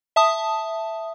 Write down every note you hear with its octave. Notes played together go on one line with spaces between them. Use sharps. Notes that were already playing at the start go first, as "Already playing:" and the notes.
E5 A5 D#6